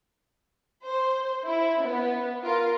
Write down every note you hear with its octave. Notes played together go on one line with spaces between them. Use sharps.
C5
E4
B3
F4 A#4